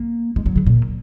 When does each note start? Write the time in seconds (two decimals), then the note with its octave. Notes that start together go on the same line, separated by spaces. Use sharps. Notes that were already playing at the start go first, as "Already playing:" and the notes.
Already playing: A#3
0.36 G#3
0.46 F#3
0.56 C#3
0.66 A#2